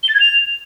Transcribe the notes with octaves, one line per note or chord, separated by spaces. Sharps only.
G7
A6
G#6
F7